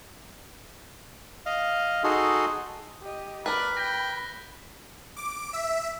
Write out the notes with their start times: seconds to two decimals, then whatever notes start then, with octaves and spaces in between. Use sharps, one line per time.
1.46 D#5 F5
2.04 D#4 F#4 G#4 A4 C6
3.03 G4 D#5
3.46 A#4 B4 D5 B5 F#6 B6
3.77 G5 A#6 G7
5.17 D6
5.53 E5